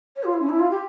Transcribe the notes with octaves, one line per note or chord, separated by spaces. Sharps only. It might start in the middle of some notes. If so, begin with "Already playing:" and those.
C#5
F4
E4
C#4
E4
F4
G4